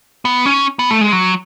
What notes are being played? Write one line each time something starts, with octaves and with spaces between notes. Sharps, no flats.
B3
C#4
B3
A3
G#3
F#3